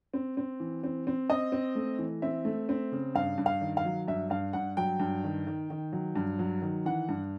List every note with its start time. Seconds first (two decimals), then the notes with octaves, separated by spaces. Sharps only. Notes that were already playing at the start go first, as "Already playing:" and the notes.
0.14 C4
0.37 C4
0.60 E3
0.84 C4
1.07 C4
1.30 C4 D#5
1.52 C4
1.75 A3
1.98 E3
2.22 C4 E5
2.45 A3
2.69 C4
2.92 C#3
3.15 G2 F5
3.38 G2
3.46 F5
3.61 D#3
3.77 F5
3.85 F#3
4.08 G2 E5
4.30 G2 F5
4.53 G2 F#5
4.77 F#3 G5
5.00 G2
5.24 D#3
5.47 D#3
5.70 D#3
5.93 F#3
6.16 G2
6.39 F#3
6.62 D#3
6.85 E3 F#5
7.09 G2